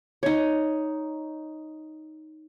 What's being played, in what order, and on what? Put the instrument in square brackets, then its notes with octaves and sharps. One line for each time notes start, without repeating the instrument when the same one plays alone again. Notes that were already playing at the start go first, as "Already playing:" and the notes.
[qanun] D#4 C#5